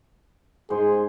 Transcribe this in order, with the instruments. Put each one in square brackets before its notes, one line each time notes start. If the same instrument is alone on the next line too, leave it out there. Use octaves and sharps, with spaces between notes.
[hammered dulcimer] G#2 C5 [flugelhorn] G#4